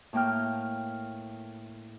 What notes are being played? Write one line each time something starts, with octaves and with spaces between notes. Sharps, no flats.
A2 A#3 G5 F6